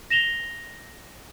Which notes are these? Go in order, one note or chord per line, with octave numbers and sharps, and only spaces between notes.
A#6 E7 F7 G7